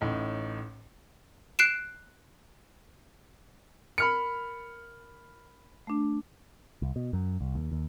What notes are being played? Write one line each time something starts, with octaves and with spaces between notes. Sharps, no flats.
A1 A2 D#4
F#6 C7 D7 E7
A#4 B5 F6 C#7
A3 D4
C2
B2
F#2
C2
D#2
D#2